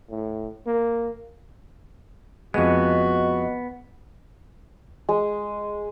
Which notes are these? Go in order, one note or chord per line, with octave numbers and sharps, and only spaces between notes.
A2
A#3
F2 G#3 B3 F#4 D#5
G#3